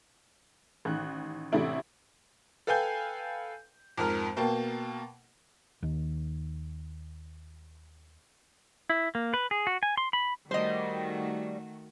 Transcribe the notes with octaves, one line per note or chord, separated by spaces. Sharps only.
A1 D#3 F#6
A1 C3 A3 D4 E4 D7
A4 B4 F5 G5 G#5 G6
F2 G#2 A#4 F6
B2 A#3 G5 A5
D#2 D#3
E4
A#3
B4
G#4
F#4
G#5
C6
B5
D#3 G3 A3 F#4 C5 D#5